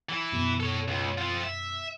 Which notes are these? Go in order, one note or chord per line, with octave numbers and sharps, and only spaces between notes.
E3 E4
F#2 B2
A4 C#5
C#2
C4 F4
E5